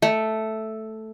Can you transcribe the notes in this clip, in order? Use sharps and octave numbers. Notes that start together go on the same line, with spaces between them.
A3